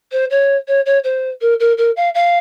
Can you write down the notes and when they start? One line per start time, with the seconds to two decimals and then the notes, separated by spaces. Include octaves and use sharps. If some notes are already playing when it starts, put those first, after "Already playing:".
0.11 C5
0.30 C#5
0.67 C#5
0.85 C#5
1.03 C5
1.41 A#4
1.59 A#4
1.77 A#4
1.96 F5
2.14 F5